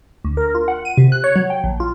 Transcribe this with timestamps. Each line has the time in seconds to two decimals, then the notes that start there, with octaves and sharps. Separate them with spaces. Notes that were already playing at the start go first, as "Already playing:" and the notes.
0.25 D2
0.37 A#4
0.55 F4
0.68 F#5
0.85 D#7
0.97 C3
1.12 F#6
1.24 C#5
1.36 F#3
1.50 G5
1.64 A#1
1.80 F4